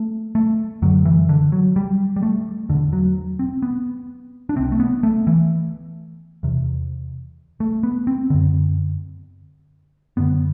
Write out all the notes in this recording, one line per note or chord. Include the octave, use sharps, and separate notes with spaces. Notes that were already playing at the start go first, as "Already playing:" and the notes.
Already playing: A3
A3
F#2 D3 F#3
E3
D3
F#3
G3
G3
A3
E2 B2 D3
F#3
C4
B3
D4
C2 C3 C4
A3
B3
A3
E3
E2 C3
A3
B3
C4
F#2 D3
F#2 D3 B3